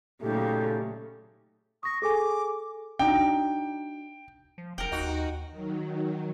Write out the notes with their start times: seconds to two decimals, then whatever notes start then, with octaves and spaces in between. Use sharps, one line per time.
0.22 A#2 C#3 F#3 A3 D#4 G4
1.83 C#6 D#6 A#6
2.02 G#4 A4 G#5 D6
2.99 D4 D#4 F#4 G5
4.58 F3
4.78 F1 A#4 F#5 G5
4.92 D#2 D#4 F#4
5.51 D#3 F#3